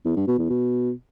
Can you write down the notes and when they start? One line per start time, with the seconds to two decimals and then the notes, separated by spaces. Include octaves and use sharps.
0.05 E2
0.16 G2
0.27 B2
0.39 E2
0.50 B2